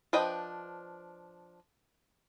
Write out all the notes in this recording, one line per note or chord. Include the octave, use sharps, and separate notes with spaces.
F3 D4 B4 D#5 G5